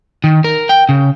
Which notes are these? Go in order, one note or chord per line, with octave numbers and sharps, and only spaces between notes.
D#3
A#4
G5
C#3